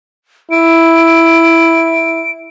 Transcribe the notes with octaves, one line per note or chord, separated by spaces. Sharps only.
E4 D7